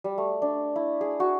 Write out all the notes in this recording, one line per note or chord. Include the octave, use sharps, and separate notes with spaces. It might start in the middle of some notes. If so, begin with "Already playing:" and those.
G3
A3
D4
E4
G#4
F#4